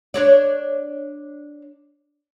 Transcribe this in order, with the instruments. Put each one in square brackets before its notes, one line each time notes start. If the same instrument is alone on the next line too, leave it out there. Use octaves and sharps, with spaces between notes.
[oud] D4 C#5 D5